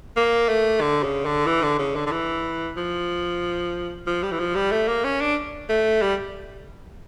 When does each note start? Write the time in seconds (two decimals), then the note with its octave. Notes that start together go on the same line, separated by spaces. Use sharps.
0.16 A#3
0.49 A3
0.81 D3
1.03 C#3
1.25 D3
1.46 E3
1.63 D3
1.79 C#3
1.95 D3
2.06 D3
2.11 E3
2.77 F3
4.07 F3
4.23 G3
4.32 E3
4.39 F3
4.56 G3
4.72 A3
4.88 A#3
5.04 C#4
5.21 D4
5.69 A3
6.02 G3